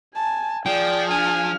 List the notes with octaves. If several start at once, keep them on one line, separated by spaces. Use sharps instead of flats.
G#5 A5
F3 G#4 D5 G5
D4 G#5 F6